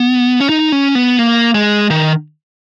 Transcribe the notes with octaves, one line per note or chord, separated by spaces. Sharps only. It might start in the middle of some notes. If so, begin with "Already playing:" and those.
Already playing: B3
C#4
D#4
C#4
B3
A#3
G#3
D#3